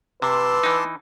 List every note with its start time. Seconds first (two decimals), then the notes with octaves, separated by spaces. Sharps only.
0.22 C3 B4 A5 C6 D6 E6
0.63 E3 D#4